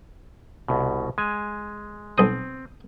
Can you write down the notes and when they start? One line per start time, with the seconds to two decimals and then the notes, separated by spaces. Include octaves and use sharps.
0.68 C2 B2
1.18 G#3 G#5
2.18 B1 C4 D#6